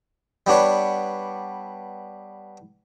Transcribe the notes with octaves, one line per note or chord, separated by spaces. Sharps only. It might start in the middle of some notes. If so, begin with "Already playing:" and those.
G3 B3 D4 C#5 F#5